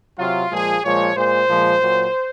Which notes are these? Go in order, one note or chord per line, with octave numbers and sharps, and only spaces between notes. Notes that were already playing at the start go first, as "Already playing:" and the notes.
C3 F#3 F4
A#2 F3 G#3 G#4
A#2 F3 G#3 C#5
A#2 G#3 C5
A#2 F3 G#3
A#2 F#3